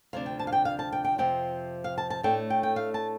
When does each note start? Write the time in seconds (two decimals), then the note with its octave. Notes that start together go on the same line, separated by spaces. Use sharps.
0.13 D2 C3 F3 D4 F5
0.26 G5
0.39 A5
0.47 F5
0.52 G5
0.65 F5
0.79 A5
0.92 G5
1.04 G5
1.18 F2 C3 F3 C4 G5
1.84 F5
1.98 A5
2.10 A5
2.23 A2 A3 D4 G5
2.50 G5
2.63 G5
2.76 F5
2.94 A5